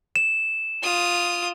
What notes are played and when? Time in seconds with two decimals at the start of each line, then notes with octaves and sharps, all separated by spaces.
0.16 E7
0.83 F4 D#6